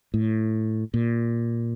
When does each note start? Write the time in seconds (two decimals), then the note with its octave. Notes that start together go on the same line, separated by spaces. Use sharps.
0.14 A2
0.94 A#2